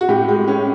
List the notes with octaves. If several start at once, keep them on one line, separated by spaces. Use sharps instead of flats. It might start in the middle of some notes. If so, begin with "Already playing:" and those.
F#4
A2 G4
G#3
C#4